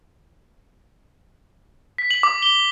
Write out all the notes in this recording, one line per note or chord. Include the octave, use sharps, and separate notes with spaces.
B6
F#7
D6
G7